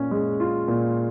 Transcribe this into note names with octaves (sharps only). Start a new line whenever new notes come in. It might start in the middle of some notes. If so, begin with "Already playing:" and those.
Already playing: A#2 C#4
G#3
F4
A#2